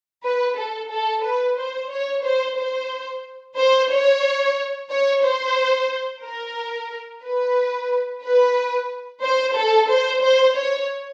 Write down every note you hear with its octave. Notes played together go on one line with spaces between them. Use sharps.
B4
A4
A4
B4
C5
C#5
C5
C5
C5
C#5
C#5
C5
A#4
B4
B4
C5
A4
C5
C5
C#5